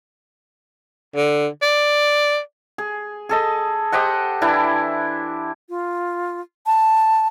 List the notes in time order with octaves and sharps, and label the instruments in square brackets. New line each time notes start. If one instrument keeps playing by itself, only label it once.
[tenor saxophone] D3
D5
[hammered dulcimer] G#4
G#4 A4 D#5
G4 C5 D#5 F#5
E3 D4 E4
[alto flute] F4
A5